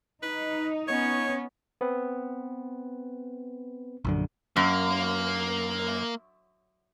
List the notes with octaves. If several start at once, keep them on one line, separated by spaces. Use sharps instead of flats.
D#4 B4
B3 C#4 C#5
B3 C4 B4
A#1 F#2 D3
F#2 A#3